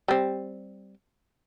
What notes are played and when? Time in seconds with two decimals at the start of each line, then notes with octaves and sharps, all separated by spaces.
0.08 G3 C4